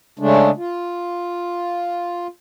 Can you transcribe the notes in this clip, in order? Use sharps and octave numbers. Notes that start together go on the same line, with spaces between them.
C#3 G#3 A3 D4
F4